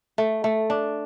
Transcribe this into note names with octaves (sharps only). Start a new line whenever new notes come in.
A3
A3
D4